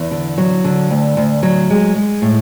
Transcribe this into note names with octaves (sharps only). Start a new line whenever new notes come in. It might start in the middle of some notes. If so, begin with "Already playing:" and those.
Already playing: E2
D3
F#3
D3
D2
D2
F#3
G#3
G#3
A2